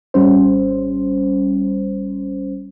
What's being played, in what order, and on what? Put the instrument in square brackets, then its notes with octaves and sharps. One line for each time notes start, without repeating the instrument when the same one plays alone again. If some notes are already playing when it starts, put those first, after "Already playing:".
[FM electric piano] G#1 G3 C#4 C5